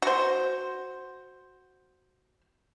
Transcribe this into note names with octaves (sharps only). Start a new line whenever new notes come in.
F#4 C5